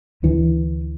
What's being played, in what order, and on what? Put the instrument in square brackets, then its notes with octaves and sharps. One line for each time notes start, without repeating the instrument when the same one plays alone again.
[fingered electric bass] D2 D3 E3